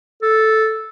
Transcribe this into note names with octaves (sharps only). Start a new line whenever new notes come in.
A4